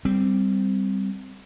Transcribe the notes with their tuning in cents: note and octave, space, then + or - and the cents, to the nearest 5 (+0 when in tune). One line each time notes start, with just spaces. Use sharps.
G3 +0 C4 -10